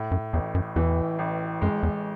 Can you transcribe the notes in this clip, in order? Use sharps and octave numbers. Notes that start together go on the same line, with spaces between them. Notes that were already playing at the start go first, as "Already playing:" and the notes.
Already playing: A2
F#2
A1 E2
F#2
E2 E3
A1
F#2 G#3
E2